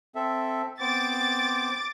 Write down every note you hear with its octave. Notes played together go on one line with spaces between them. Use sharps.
C4 A4 E5
B3 C4 C5 D6 A6